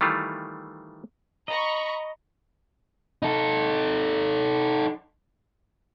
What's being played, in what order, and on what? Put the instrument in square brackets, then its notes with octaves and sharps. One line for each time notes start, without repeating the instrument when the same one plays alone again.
[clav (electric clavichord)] D#3 E3 G3 A3 F4
[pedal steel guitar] D#5 [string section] A#5 B5 C#6
[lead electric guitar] D#4 A4